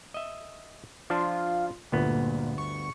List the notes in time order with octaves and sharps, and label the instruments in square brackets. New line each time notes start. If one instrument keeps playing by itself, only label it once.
[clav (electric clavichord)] D#5 E5
[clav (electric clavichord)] F3 D4 A5 [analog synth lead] F4
[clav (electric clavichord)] G1 D2 B3 [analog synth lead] A#2
[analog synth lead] C#6